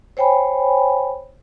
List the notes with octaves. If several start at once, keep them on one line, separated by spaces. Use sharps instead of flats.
C5 C#5 G5 G#5 B5